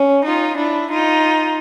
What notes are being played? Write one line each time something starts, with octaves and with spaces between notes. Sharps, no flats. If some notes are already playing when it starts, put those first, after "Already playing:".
Already playing: C#4
D#4 F4
D4 E4
D#4 F4